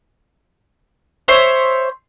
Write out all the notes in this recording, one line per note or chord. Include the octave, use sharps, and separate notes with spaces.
C5 C#5 E5